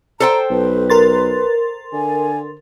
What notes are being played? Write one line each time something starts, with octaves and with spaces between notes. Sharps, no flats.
A4 C5 G5 A#5
B1 B4
A#4 C6 A6
D3 G#5